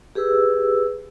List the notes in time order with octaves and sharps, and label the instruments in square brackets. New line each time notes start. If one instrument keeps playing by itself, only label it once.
[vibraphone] G4 G#4 B4 E6